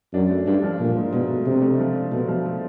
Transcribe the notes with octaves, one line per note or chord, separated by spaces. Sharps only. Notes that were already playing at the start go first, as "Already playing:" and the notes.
F#2 D4
A3
G2 D4
F3
A#2 F3
G#2
G#2 B2
A3
C3 D4
A3
F3
D4
B2 A3
F3
A3